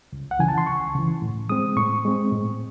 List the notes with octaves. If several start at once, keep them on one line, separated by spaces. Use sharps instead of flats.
C#2
F#5
C#3 E3 G#5
A5
C6
C#2 C#6
C#3 E3
A2
G#3 C4 D#6
A2 C#6
G#3 C4
A2